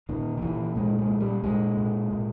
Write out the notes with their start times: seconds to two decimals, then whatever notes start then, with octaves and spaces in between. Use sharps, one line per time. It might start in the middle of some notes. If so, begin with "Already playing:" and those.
0.09 A#2 D#3
0.37 D#3
0.42 A#2 E3
0.75 A#2 G#3
0.99 G#3
1.10 A#2
1.20 G3
1.43 A#2 G#3
1.77 A#2
2.11 A#2